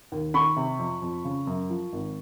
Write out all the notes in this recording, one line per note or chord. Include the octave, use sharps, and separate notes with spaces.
D#2
D#3 B5 C#6
C3
F2
F2
C#3
F#2
F3
G#1